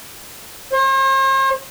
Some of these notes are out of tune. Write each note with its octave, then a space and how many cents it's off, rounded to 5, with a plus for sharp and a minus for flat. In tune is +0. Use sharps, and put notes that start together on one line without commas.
C5 +45